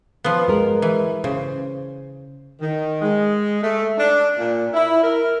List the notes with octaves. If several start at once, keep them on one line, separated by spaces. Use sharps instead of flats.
F3 B3
G#3 A#4
E3
C#3 C5
D#3
G#3
A3
D4
A#2
E4
A#4